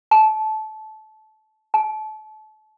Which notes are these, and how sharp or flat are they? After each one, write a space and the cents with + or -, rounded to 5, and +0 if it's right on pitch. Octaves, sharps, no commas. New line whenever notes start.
A5 -20
A5 -30